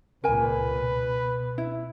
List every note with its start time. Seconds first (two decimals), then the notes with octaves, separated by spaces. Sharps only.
0.24 C#2 A#2 A#4 B4 G#5
0.72 B2
1.58 E4